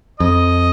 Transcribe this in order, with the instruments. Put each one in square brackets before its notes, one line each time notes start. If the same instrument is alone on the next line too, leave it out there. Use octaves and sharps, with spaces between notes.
[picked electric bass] F2 [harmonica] D#5